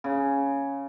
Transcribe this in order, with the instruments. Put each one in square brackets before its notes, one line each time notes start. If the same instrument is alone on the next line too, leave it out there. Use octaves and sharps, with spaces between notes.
[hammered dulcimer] C#3